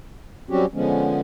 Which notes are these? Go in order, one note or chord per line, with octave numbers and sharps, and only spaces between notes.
F#3 G3 C4 C#4 F#4 G4
D3 F3 G#3 B3 C#4